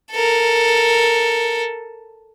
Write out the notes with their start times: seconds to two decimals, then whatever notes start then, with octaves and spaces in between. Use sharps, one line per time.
0.12 A4 A#4